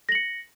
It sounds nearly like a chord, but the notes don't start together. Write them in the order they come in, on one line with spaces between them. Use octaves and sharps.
A#6 F#7 C#7